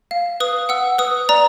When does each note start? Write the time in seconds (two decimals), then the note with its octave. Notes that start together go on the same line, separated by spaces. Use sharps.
0.11 F5
0.40 B4 D#6
0.69 F#5 E6
0.98 B4 D#6
1.29 D5 A#5